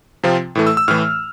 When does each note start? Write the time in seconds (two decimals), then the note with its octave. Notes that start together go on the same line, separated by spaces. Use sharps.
0.23 C3 F3 C4 F4
0.55 A2 E3 A3
0.67 E6
0.77 E6
0.88 A2 E3 A3 F6